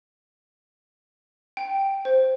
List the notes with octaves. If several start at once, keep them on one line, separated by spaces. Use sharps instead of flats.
G5
C5